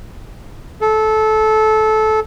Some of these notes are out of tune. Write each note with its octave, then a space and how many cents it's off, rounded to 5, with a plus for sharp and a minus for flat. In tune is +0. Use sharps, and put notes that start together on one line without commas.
A4 -20